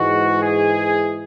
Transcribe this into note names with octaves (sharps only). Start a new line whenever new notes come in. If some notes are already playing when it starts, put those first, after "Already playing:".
Already playing: G#2 E3 G#3 F#4
G#4